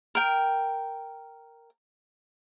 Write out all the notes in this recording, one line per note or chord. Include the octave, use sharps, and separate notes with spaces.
A#4 G5